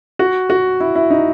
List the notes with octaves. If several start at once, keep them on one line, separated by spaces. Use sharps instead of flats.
F#4
F#4
E4
E4
D#4